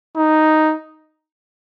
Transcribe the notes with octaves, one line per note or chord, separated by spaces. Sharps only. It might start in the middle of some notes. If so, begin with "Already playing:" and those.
D#4